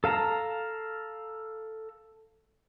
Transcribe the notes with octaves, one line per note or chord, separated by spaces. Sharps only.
A4 F5 A5 A#5